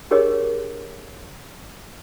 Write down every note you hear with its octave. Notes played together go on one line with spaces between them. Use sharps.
D4 G4 G#4 A#4 C#5 D#5